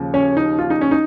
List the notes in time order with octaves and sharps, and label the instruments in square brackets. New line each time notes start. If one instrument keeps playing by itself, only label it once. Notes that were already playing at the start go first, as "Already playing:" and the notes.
Already playing: [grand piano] D#2 C#3 F3
C#4 C#5
D#4
F4
D#4
C#4
D#4